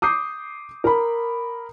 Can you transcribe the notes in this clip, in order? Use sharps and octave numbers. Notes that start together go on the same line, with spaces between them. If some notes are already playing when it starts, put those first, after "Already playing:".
D6 D#6 G6 C7
A#4 B5